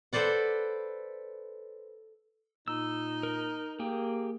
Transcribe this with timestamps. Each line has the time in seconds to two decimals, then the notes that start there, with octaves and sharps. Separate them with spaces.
0.13 A4 B4 C5 D5 F#5
2.68 A#2 D#4 E6
3.23 A#4
3.79 A#3 G4 G#4 G5